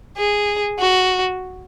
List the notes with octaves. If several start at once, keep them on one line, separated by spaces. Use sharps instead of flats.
G#4
F#4